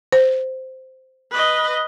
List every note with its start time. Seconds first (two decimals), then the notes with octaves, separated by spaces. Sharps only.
0.12 C5
1.32 B4 D#5